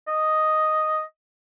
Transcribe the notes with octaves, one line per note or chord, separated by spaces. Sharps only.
D#5